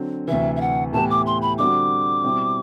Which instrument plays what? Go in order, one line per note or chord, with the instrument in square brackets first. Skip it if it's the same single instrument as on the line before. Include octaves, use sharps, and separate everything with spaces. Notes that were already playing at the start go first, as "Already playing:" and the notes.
Already playing: [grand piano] D3 F#3 C4
[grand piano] D2 C3 E3 [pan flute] E5
[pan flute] E5
F#5
[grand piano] A2 E3 B3 E4 G4 [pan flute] A5
[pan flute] D6
C6
B5
[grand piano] D3 G3 C4 F#4 [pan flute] D6
[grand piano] B2 G3 C4 E4 G4